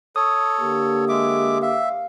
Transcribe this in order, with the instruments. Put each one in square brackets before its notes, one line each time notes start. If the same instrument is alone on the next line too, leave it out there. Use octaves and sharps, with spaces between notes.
[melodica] A4 C#5 [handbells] D#6
[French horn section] D3 A#3 G4
[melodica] G#3 E5 D6
[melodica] E5 [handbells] F5